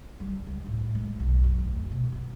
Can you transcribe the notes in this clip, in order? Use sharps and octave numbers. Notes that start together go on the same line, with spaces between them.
G3
C#2
A2
G#3
B1
F#2
D2
B2
B3